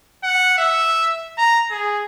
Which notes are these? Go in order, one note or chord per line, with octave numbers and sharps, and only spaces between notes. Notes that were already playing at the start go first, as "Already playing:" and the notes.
F#5
E5
A#5
G#4